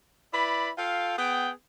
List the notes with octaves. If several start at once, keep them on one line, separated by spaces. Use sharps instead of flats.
E4 B4 D5 B5
F4 A4 F5 G5
B3 G#4 G5